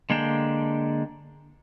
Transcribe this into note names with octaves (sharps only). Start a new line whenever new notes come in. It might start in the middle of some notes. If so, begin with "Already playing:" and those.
D3 G#3 A#3 D4 G5